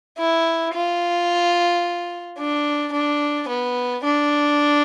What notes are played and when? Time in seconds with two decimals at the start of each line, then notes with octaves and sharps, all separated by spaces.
0.18 E4
0.73 F4
2.38 D4
2.93 D4
3.48 B3
4.04 D4